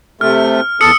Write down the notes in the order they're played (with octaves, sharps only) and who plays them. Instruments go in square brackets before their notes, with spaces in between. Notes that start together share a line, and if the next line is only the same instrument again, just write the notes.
[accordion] C3 A3 [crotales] F6
[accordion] E2 A4 [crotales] D#6 E6 C#7